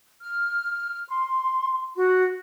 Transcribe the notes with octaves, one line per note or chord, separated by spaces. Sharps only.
F6
C6
F#4